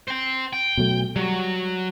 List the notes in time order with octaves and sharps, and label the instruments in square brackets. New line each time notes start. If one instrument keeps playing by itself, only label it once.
[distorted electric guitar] C5 G5
G5
[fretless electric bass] B2 F#3 A3
[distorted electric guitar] F#3 [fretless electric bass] G3